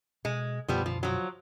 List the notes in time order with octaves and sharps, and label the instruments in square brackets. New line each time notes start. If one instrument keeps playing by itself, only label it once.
[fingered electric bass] B2 [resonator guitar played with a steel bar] G#3
[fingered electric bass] F#2 B2 D3 [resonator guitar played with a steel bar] F3 G3 B3
[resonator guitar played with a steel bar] F3
F3 F#3